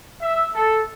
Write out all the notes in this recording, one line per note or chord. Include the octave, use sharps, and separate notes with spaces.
E5
A4